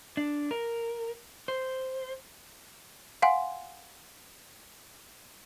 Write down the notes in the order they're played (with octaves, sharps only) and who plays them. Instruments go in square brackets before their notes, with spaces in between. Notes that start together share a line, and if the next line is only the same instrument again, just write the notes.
[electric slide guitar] D4
A#4
C5
[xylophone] F5 F#5 G#5 C6